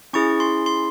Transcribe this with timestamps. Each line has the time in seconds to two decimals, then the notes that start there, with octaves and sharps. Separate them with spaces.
0.13 C#4 E4 G#4 C#6
0.40 C6
0.66 C6